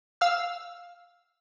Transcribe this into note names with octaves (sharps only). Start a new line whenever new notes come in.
F5 E6 F6